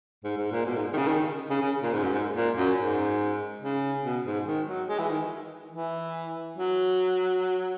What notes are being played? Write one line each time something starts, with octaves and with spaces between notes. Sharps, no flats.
G#2
G#2
A#2
B2
G#2
D#3
C#3
D#3
C#3
C#3
A#2
G#2
F#2
G#2
A#2
F#2
G#2
C#3
B2
G#2
D#3
F#3
G#3
E3
D#3
E3
F#3